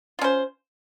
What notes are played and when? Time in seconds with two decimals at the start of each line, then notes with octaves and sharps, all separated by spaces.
0.19 F4
0.21 C#4
0.24 C5